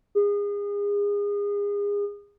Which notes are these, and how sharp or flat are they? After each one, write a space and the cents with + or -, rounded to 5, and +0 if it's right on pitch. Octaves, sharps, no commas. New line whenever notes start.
G#4 -30